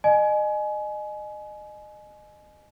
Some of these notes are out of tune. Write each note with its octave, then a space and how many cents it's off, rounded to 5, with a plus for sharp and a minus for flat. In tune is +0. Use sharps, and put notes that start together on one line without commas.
D#5 -30 G#5 +25